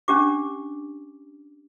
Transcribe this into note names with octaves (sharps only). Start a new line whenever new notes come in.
C#4 D4 G4 D6